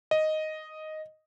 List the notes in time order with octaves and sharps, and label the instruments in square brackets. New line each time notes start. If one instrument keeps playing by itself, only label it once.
[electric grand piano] D#5